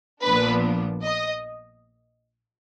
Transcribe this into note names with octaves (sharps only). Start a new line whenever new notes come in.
A#1 A#2 F3 B3 D4 B4
D#5